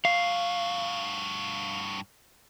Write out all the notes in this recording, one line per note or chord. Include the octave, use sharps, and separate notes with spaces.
G2 F#4 F5